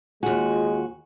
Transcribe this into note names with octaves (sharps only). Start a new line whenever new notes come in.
D#2 G#3 F4 F#4 G#5